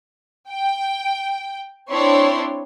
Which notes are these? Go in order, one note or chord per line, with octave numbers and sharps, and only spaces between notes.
G5
C4 D4 E4 C#5 C6